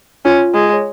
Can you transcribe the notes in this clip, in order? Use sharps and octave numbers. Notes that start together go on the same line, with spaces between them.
C#4 F4
G#3
C#5